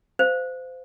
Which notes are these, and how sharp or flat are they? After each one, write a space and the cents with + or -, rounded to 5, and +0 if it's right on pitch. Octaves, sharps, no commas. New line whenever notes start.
C5 -25 F5 +0